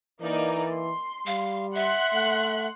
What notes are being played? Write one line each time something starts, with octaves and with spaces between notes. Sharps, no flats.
E3 A#3 D#4 D5
C6
G3 F5
E5 F#5 C6 F#6
A3